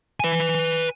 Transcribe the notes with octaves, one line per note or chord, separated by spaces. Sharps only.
B4 G#5